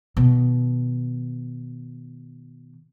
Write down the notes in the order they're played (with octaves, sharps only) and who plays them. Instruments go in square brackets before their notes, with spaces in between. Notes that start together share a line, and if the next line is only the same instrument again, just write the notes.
[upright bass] B2 D#3